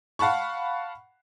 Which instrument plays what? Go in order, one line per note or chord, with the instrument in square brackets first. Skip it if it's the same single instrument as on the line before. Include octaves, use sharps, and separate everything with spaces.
[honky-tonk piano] F5 F#5 A5 B5 C#6